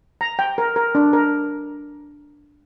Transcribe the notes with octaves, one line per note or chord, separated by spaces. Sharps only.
A#5
G5
A#4
A#4
D4
A#4